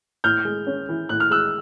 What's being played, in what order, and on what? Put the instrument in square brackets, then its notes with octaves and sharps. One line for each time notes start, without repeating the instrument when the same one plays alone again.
[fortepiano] A2 [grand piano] F6 G6
[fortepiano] G#3
C#4
E3
[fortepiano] A2 [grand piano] F#6
[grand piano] F6
[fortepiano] G#3 [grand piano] E6 F#6